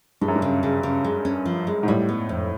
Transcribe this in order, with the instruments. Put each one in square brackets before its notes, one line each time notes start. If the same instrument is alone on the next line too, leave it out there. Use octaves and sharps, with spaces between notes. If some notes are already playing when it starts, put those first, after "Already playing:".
[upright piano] G2 [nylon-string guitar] G#3
[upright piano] F#2
G2
[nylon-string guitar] C#3
C#3
C#3
G#3
C#4
F3
G#3
[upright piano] G#2
[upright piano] A2 [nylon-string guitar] G3
[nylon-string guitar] B3
F2